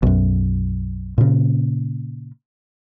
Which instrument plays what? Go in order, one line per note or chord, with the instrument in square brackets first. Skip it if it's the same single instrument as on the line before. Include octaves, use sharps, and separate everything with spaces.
[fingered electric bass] B1 F#2
A#2 C#3